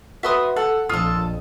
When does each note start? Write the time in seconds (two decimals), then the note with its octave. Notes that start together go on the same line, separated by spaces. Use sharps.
0.23 F#4 B4 E5 C6 D#6
0.56 A4 F#5
0.89 A#1 F2 F4 A4 D#6